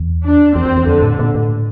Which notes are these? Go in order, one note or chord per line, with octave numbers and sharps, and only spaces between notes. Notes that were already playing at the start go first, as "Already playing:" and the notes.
Already playing: E2
D4
E2 C4
E2
E2
F2 D3
A2
A#2
A2